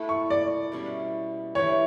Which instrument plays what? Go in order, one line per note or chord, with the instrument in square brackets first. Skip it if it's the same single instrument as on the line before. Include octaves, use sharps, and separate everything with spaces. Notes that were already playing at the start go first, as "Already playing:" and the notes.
Already playing: [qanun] A3 E4 A4
[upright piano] C#6
D5
[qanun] B2 G3 C#4 E4
[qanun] E3 A3 D4 G4 [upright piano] C#5